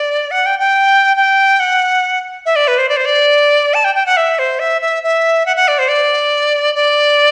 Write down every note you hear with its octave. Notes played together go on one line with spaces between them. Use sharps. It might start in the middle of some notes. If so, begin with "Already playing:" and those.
Already playing: D5
F#5
G5
G5
G5
F#5
E5
D5
B4
C5
D5
C5
D5
A5
G5
G5
F#5
E5
C5
E5
E5
E5
F#5
F#5
D5
C5
D5
D5